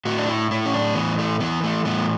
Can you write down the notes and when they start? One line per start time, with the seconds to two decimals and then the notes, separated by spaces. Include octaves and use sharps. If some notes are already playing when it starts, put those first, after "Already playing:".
0.05 A2 F#4
0.18 D4
0.28 E4
0.51 A2 E4
0.66 C#4
0.74 D4
0.95 E3 B3
1.19 A3
1.40 E3 B3
1.63 A3
1.85 A2 B3